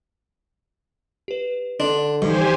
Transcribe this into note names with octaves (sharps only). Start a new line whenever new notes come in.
G4 B4
D3 D4 C6
G2 D#3 E3 D#4 G4 C5 G#5